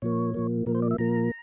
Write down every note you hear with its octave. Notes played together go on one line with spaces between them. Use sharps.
A#2 F3 A#3 C#5
A#2 F3 A#3
A#2 F3 A#3 A#4
C5
D5
E5
A#2 F3 A#3 A#5